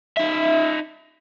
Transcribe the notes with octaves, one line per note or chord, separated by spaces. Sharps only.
D#4 E5